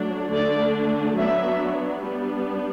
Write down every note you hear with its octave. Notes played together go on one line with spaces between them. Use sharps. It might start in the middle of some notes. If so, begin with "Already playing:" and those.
Already playing: F#3 A3 D4
D3 A3 D4 D5
F#3 B3 D4 E5
G3 B3 D4